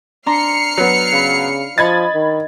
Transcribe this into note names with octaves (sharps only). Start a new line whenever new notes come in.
D4 A#5 C6 F6 C7 C#7
F#3 B3
C#3 F5 B5
F3 D#5 B5 G#6 A6
D#3